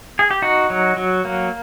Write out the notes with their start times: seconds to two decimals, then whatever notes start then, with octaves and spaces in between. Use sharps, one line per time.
0.19 G#4
0.31 G4
0.42 D#4 F#4
0.70 F#3
0.97 F#3
1.25 A#3